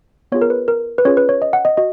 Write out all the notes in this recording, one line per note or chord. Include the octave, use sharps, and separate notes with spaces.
B3 F4 G#4 C#5
A#4
B4
A#4
B4
C#4 F4 G#4 C#5
B4
C#5
D#5
F#5
D#5
F#4 D#5